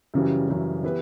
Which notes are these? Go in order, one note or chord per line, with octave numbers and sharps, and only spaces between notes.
F#2 C#3 E3 G3
F#2 C#3 E3 G3
E3 B3 E4 G4 B4